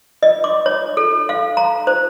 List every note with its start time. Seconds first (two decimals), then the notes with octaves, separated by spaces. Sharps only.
0.23 D#5
0.44 D6
0.66 C#5
0.97 A4
1.29 F5
1.57 A#5
1.87 C5